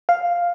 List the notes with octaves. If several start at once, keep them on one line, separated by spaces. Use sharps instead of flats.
F5